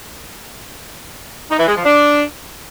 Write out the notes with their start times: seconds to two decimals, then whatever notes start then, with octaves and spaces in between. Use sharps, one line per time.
1.51 D#4
1.59 E3
1.68 G#3
1.76 F3
1.85 D4